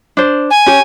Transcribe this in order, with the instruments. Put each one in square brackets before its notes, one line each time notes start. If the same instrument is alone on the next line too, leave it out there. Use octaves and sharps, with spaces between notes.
[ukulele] D4 C5
[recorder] G#5
[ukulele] C#4 G4 C#5